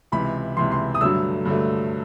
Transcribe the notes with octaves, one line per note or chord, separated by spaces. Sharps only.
C#2 C3 E3 B5
C#2 C3 E3 C6
C6
D#6
G2 D3 F#3 A3 E6
G2 D3 F#3 A3